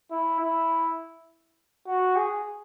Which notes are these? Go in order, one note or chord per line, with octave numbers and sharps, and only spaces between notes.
E4
E4
F#4
G#4